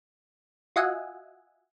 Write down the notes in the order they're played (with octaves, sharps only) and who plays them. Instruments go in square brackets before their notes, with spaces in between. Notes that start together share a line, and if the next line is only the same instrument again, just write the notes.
[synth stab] F4 F#4 D#5 E5 F#5 G#5